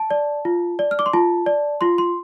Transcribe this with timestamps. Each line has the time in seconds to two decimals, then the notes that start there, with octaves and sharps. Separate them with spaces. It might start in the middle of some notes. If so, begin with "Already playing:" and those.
Already playing: A5
0.11 D5
0.45 F4
0.79 D5
0.91 F6
0.99 D6
1.06 C6
1.13 F4 A5
1.46 D5
1.81 F4 C6
1.98 C6